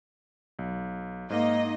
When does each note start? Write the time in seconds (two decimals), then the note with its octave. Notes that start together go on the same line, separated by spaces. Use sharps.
0.59 B1
1.30 G#2 A#3 D#4 D#5